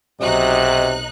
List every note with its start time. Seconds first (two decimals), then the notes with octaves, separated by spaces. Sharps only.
0.21 B1 C3 D#4 F#4 D#5 F#6